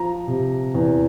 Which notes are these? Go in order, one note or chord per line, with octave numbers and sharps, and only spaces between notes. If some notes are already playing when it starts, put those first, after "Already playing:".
Already playing: F3 A#5
C3
E2